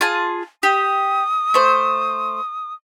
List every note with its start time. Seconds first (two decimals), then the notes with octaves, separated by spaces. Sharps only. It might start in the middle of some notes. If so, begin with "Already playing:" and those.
0.01 F4 G#4 A5
0.63 G4 D#6
1.54 A3 C5